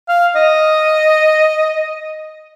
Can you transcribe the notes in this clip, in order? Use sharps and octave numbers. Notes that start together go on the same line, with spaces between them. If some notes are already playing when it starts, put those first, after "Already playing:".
F5
D#5